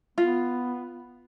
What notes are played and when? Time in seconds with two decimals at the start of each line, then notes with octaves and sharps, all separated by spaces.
0.18 B3 F4